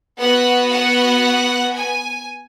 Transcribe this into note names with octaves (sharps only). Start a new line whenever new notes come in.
B3 F#4 F#5
F#5
G#5